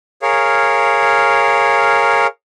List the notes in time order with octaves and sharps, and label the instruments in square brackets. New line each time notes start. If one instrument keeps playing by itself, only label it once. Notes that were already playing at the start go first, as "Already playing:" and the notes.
[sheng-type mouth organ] G#4 A#4 C#5 F5